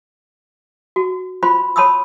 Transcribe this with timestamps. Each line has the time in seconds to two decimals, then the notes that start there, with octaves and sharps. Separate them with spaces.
0.96 F#4
1.43 F4 C5 B5 C6
1.76 C#5 A5 B5 C6 D#6 E6